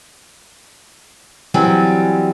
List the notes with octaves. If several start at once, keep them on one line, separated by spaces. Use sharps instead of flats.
E3 F#3 G3 C4 G#5